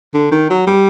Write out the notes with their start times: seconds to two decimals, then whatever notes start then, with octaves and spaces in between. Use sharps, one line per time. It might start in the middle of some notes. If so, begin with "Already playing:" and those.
0.14 D3
0.32 D#3
0.50 F#3
0.67 G3